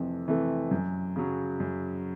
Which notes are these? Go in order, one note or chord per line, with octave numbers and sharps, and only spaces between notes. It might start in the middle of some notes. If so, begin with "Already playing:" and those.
Already playing: F2 C3 E3 A3
C3 E3 A3
F#2
C#3 F#3
F#2